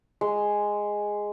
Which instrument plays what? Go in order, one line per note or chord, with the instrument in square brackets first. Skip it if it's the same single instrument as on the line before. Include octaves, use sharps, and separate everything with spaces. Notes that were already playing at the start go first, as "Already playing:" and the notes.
[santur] G#3